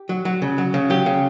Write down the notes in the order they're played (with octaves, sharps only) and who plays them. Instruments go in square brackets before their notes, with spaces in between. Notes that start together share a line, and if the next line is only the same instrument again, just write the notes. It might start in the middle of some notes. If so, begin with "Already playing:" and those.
Already playing: [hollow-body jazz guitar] G4
F#3
F#3
C#3
F#3
C#3
F#3 G4
C#3